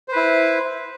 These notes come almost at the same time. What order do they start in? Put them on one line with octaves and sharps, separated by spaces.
C5 B4 E4